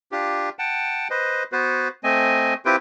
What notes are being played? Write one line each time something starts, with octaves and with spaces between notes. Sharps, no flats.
D4 F4 G4
F#5 G5 A5
B4 C5 D#5
B3 F#4 B4 C5
A3 C4 D#5 G#5
C4 E4 F4 G4 B4 G5